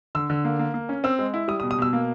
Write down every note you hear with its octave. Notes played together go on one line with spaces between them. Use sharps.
D3 E6
D3
A#3
A#3
A#3
C#4
C4 E6
G#3
E4
G3 D#6
D#6
B2
D#6
B2 E6
A#3